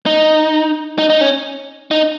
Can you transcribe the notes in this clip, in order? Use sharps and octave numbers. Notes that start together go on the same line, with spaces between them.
D#4
D#4
D#4
C#4
D#4